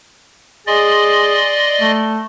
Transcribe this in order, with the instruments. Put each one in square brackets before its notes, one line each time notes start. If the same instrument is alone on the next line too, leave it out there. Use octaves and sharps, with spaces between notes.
[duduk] G#4 [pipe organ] D5 D#5 C6
[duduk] A3